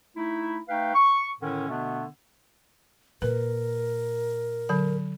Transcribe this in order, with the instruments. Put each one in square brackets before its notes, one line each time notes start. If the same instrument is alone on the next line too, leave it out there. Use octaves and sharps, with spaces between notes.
[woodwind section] A3 D#4 E4
A3 D#4 B4 F5 G5
C#6
A2 D3 D#3 C#4
B2 D3 A3 B3 D4
[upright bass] A#2 [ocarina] A#4 [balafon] B4
[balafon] D3 F#3 B5